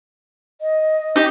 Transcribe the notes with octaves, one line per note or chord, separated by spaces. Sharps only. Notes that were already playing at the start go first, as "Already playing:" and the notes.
D#5
D#4 G4